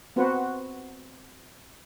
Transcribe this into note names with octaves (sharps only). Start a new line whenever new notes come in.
B3 C4 F#4 B4 C5 F#5